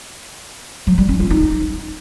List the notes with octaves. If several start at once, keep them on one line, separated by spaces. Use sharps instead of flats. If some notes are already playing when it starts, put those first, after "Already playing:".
F#3
G3
C#4
F4
D#4